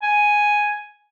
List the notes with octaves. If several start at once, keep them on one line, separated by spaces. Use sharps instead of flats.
G#5